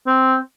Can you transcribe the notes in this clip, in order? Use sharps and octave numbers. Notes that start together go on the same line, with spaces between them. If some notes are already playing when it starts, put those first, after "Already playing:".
C4